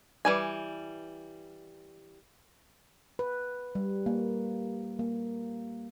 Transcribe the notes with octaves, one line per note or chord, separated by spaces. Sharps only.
E3 G3 G#5
B4
G3
A#3
A#3